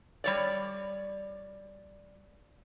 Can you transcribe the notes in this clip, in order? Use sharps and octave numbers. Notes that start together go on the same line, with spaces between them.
G3 C#5 D5